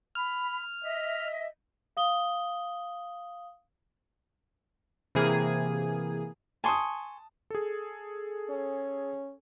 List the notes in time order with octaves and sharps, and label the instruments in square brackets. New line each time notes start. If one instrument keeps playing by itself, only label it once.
[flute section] B5 [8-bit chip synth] F6
[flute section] D#5 E5
[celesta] F5 D#6 G7
[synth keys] C3 E3 A#3 G#4
[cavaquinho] G#5 C6 C#6 [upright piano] A5 D#6
[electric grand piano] G#4 A4
[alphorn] C#4